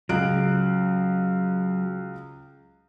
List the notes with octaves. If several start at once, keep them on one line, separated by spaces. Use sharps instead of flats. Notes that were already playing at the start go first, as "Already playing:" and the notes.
C#2 F#3 F#6 D7